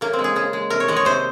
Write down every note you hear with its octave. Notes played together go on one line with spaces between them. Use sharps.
C#3 A#3
C4
G#3
G#4
C#3 G#4
G#3
C3 A#4
C#5
D#3 G#3 D#5
C#5
C3 C5